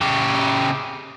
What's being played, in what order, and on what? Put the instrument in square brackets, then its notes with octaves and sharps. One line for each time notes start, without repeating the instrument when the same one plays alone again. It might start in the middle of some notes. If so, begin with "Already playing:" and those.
[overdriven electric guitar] C#3 G4